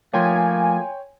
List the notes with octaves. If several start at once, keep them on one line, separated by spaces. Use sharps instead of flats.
F3 A3 A#3 C#5 G5 G#5 C6